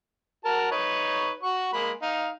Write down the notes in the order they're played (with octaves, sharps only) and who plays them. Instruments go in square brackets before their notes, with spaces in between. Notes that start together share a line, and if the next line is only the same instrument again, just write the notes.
[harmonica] F#4 A#4 A5
D#4 B4 C#5
F#4 C#6
G#3 A#3 B5
D#4 F5